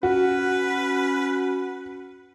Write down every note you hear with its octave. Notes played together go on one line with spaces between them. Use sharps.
C#4 F#4 B4